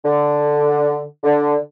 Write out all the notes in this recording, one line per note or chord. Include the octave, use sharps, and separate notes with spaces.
D3
D3